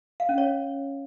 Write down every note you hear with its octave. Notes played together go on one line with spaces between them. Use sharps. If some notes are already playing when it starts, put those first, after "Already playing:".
F5
C#4
C#5